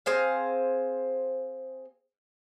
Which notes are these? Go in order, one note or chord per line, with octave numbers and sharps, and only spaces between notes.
C4 G#4 C5 F5